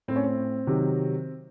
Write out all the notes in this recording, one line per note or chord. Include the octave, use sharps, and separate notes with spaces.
A2 A3 C4
C#4
C4
C3 D#3 F#3